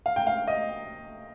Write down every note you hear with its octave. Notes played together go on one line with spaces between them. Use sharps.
F5
G5
F5
D#5